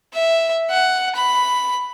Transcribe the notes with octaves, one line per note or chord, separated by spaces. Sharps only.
E5
F#5
B5